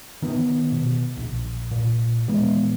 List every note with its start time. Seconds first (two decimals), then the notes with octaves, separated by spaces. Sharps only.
0.22 D#3 B3
0.72 B2
1.17 A#1
1.71 A#2
2.28 A#2 E3 G#3 B3